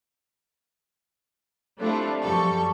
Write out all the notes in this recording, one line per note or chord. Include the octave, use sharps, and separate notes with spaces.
G3 A3 C4 D4 E4 F4
F#2 F3 G3 A4 C#6